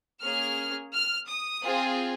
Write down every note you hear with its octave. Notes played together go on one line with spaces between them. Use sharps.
A#3 C#4 G#4 F6
F6
D#6
C4 F4 G#4